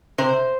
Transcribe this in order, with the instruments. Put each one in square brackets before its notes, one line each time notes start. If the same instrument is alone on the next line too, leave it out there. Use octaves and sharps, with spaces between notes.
[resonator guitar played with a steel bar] C3 C5